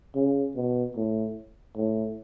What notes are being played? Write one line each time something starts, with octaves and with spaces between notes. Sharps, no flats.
C#3
B2
A2
A2